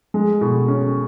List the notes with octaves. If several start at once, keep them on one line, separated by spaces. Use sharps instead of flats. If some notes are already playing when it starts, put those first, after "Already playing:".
G#3
B2
C#4